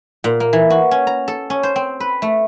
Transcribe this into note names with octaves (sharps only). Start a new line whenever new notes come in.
A#2
A#3
E3
F#4
C#4
A#5
A4
C#4
C5
C4
B4
A3